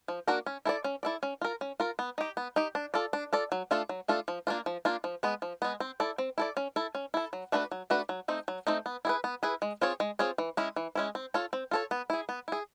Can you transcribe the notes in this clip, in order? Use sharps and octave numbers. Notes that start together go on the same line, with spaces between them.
F3
A#3 D4 F#4 A#4
C#4
E4 A4 D5
C#4
E4 A4 D5
C#4
F4 A#4
C#4
F4 A#4
B3
D#4 G4
B3
D#4 G4
D4
F4 A4 D5
D4
F4 A4 D5
F#3
A3 D4 F4 A4
F#3
A3 D4 F4 A4
F3
A#3 D4 F4
F3
A#3 D4 F4
F3
G#3 B3
F3
G#3 B3
C4
E4 A4 D5
C4
E4 A4 D5
C#4
E4 A4
C#4
E4 A4
F#3
A3 D4 F#4 B4
F#3
A3 D4 F#4 B4
F#3
A3 C4 D#4
F#3
A3 C4 D#4
B3
E4 G#4 B4
B3
E4 G#4 B4
G#3
C4 F4 G#4 C#5
G#3
C4 F4 G#4 C#5
E3
G#3 C#4 E4
E3
G#3 C#4 E4
C4
F4 A4 C#5
C4
F4 A4 C#5
B3
E4 G#4
B3
E4 G#4